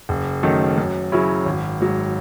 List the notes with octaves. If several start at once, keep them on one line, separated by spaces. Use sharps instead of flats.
F#1
F#2 D#3 A3
F#2
C#3 F#3 C#4 E4
G#1
G#2 F#3